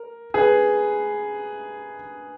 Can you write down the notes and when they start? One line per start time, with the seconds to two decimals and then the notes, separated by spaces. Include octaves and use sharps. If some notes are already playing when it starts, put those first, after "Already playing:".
Already playing: A#4
0.34 G#4 B4